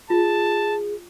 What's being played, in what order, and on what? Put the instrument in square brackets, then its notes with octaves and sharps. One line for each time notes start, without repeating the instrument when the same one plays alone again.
[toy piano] F4 [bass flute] G#4 [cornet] A5